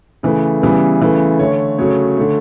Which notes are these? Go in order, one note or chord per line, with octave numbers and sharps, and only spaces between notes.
C#3 E3 A3
C#3 E3 G3 B3
C#3 E3 A3
D3 A3 C#5
C#3 F#3 A3 C#5
D3 A3